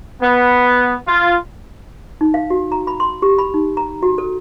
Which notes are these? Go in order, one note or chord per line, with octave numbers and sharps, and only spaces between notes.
B3
F4
D#4
F5
F#4
A#5
B5
C6
G4
B5
D#4
A#5
F#4
A4